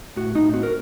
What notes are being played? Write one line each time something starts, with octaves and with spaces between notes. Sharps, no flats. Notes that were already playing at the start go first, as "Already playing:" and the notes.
A2 F#4
A2 D#4
C4 F#4
A#4